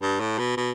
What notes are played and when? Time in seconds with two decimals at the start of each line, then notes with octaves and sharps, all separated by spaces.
0.02 G2
0.20 A2
0.39 B2
0.57 B2